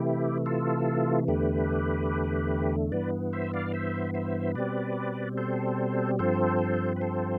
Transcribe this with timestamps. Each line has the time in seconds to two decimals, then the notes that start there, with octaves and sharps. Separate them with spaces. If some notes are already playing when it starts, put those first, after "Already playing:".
Already playing: C3 E3 A3 E4 G4
0.46 F4 A4
1.28 E2 D3 A3 G4 B4
2.92 G2 E3 B3 B4 D5
3.33 C5 E5
3.54 D5 F5
3.74 C5 E5
4.14 C5 E5
4.55 B2 G3 C4 B4 D5
5.37 A4 C5
6.19 G2 F3 C4 A4 C5
6.96 B4
7.01 A4 C5